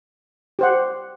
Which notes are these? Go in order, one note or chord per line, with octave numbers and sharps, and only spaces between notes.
G4 C5 F#5